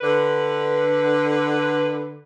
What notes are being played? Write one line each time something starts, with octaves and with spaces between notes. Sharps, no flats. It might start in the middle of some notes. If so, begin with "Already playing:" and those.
D3 B4